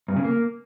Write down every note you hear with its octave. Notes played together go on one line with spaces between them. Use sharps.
G2
C#3
A#3